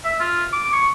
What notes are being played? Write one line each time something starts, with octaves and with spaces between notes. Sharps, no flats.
E5
F4
D6
C#6